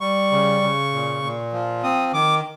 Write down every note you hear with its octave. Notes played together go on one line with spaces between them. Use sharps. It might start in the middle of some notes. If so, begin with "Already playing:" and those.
G3 C#6
C#3
C#3
A#2
A#2
F3
C4 D#6
D#3 D6